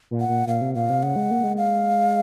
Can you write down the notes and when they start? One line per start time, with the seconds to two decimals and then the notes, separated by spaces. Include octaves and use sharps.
0.11 A#2
0.20 F#5
0.29 A#2
0.47 A#2 F5
0.61 C3
0.75 A#2 F5
0.89 C3
1.03 C#3 F#5
1.16 G#3
1.31 A#3
1.44 G#3
1.58 F5